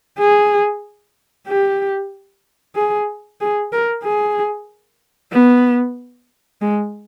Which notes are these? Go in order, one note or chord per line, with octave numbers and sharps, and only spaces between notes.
G#4
G4
G#4
G#4
A#4
G#4
B3
G#3